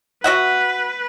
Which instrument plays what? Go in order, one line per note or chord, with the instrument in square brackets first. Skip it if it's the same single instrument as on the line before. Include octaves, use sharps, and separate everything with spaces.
[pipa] F#4 E5 F#5 [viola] B4